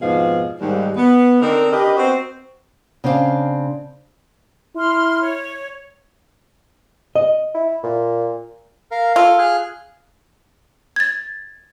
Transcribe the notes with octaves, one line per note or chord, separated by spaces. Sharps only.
F2 G#2 B2 F3 G#4 F5
D#2 G#2 G3
B3
D3 C4 D4 D#4 A#4
D4 G4 A#4 B4 D#5
B3 C4 F#4 C5
C#3 C4 D4 G#4 F5 A5
E4 C6 F6
C#5
D#5
E4
A#2
A#4 F5
F4 A4
G#4 F6 F#6
G#6 A6